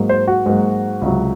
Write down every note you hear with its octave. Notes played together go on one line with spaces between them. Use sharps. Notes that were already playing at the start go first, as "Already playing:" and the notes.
Already playing: G#2 F#3 A#3
C5
F#4
G#2 F#3 A#3
C#2 C3 F#3